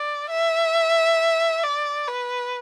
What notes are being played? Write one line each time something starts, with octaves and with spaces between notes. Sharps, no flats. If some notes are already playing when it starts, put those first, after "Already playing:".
Already playing: D5
E5
D5
B4